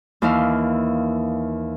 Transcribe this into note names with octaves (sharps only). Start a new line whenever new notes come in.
D#2 E3 E4 F5